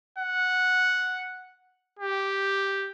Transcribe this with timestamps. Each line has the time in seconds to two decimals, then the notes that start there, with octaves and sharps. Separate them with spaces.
0.18 F#5
1.99 G4